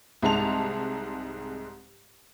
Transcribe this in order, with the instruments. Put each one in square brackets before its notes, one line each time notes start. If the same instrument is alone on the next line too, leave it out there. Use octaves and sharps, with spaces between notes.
[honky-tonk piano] C2 G#2 G#3 A5 F7